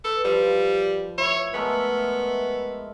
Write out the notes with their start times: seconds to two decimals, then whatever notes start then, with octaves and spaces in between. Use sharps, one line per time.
0.04 A4 B4
0.24 F3 G3
1.18 E4 C#5
1.54 G#3 A3 B3 A#4